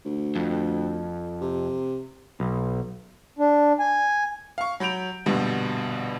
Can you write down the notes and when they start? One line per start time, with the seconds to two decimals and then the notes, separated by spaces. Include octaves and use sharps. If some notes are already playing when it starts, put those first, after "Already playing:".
0.05 D2
0.36 F2
1.41 C3
2.40 B1
3.39 D4
3.80 G#5
4.58 F5 C#6
4.80 F#3 B5 G6 D7 F7
5.26 A#1 G2 B2 D3 G3